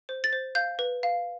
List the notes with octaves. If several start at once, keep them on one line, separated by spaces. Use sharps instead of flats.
C5
A6
C5
F5 G6
B4
F5